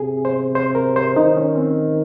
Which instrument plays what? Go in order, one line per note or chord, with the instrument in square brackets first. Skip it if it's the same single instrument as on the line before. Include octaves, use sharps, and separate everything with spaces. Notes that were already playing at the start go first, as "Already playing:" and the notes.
Already playing: [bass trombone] C3 [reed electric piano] G#4
[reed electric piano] C5
C5
A#4
C5
[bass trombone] D#3 [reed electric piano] D#4
[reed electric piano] C#4
C4